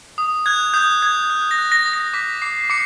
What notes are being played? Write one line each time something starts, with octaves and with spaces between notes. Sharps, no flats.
D#6
F#6 G#6
D#6 G6
D#6 G#6
F#6
A#6
F#6
A#6
D#6
A#6
D6 B6
D6 C7
D6 C#7